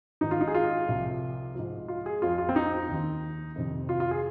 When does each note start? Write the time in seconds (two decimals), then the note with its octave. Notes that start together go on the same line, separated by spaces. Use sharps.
0.21 G#2 D#3 D#4
0.31 F4
0.41 D#4
0.48 G#4
0.54 F4
0.88 C2 C3 F3
1.55 G#2 F3
1.88 F4
2.06 G#4
2.22 F2 F3 F4
2.38 F4
2.49 C4
2.56 D#4
2.89 D#2 D#3
3.56 F2 C3 D#3
3.89 F4
4.00 F4
4.11 G#4